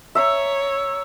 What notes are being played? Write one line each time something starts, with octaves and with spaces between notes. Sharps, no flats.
C#5 E5 A#5